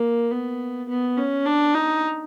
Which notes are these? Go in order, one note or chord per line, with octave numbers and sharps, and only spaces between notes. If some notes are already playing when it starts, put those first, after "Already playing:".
Already playing: A#3
B3
B3
C#4
D4
D#4